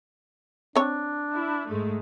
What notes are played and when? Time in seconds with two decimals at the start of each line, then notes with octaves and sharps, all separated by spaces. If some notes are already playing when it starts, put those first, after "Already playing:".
0.76 C4 D4 C#5
1.33 E4
1.68 G#2 G#3 A3